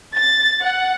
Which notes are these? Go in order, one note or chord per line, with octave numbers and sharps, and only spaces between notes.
A6
F#5